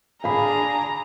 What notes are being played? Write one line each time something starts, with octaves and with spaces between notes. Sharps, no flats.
D4 G#4 F5 A#5 B5